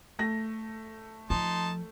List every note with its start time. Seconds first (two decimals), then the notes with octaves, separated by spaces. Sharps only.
0.19 A3 A#6
1.30 F3 D#4 A5 C6